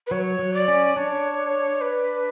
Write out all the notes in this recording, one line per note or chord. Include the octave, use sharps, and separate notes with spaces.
B4
F#3 C#5
F#3
D5
C#4
D4 C#5
B4